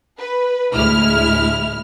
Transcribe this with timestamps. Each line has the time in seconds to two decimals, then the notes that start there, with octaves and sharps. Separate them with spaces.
0.19 B4
0.72 D2 A2 G#3 E4 F6